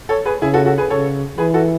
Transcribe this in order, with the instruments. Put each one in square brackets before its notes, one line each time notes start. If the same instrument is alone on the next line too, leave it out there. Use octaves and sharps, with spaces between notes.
[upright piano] A4 C#5
G#4 B4
[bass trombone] C#3 [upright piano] E4 G#4
[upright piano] F#4 A4
F#4 A4
G#4 B4
[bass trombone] C#3 [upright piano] A4 C#5
[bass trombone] E3 [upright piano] G#4 B4
[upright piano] F#4 A4